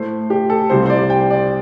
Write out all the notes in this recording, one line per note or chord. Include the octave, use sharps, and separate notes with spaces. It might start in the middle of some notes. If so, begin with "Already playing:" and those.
Already playing: A2 A3 C5
G4
A4
C2 C3 G3 C5
C5
D5
G5
D5